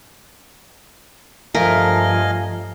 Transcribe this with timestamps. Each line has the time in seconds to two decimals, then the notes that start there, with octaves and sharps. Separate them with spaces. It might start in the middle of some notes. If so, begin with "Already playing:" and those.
1.55 G2 F3 A3 A#4 D#5 F5 G#5